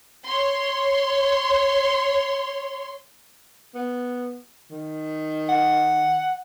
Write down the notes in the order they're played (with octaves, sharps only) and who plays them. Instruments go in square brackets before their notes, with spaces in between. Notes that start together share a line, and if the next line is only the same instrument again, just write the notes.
[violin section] C#5 C6
[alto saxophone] B3
D#3
[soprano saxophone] F#5